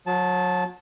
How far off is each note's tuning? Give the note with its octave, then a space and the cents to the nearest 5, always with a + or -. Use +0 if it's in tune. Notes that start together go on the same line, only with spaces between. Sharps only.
F#3 -30 A5 -15